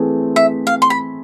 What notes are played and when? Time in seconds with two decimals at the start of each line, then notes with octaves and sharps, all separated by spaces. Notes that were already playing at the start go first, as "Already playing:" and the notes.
Already playing: E3 A3 C4 G#4
0.36 E5
0.67 F5
0.82 C6
0.90 B5